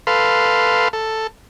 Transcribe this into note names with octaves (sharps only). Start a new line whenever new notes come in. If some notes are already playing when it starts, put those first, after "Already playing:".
A4 B4 F5 C6
A4